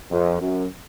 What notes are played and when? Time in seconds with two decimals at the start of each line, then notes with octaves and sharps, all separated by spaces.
0.11 F2
0.40 F#2